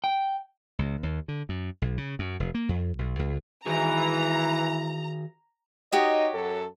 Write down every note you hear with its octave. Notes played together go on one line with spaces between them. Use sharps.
G5
C#2
D#2
D3
F#2
B1
C#3
F#2
F1
A#3
F2
B1
C#2
D#3 E3 F#4 G#4 A#5
D#4 F#4 G4 C#5 D#5
F#2 F#3 A4